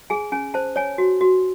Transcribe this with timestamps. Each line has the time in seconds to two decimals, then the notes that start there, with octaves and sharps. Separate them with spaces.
0.10 G#4 G#5
0.32 C#4 G#5
0.54 C5 A5
0.76 C#5 G#5
0.98 F#4
1.21 F#4